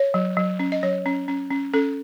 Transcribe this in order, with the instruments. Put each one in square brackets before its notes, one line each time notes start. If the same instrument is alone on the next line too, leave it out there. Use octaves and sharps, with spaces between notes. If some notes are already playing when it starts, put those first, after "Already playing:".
Already playing: [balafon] C#5
F#3
F#3
C#4
D#5
F#3 C#5
C#4
C#4
C#4
C#4 A4